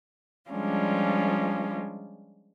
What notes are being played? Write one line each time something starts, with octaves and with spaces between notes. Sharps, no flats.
F3 G3 G#3 C#4 D4 F4